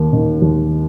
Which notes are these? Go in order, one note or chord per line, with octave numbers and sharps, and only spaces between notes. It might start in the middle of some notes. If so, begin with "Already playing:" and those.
Already playing: D#2 A#3
D#3
D#2